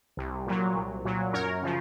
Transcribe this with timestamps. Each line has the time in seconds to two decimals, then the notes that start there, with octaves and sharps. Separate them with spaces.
0.17 C2
0.47 A#2 F#3
0.76 C2
1.05 A#2 F#3
1.33 F#2 A#4 C#5
1.62 C#3 F3